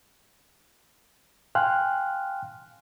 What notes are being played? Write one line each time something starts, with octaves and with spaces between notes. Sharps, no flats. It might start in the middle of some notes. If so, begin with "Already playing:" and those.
F5 G5 G#5 C6 F6 F#6